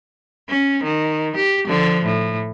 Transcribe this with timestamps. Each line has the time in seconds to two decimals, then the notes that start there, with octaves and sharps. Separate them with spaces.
0.49 C#4
0.84 D#3
1.37 G4
1.67 D3 F3
2.04 A2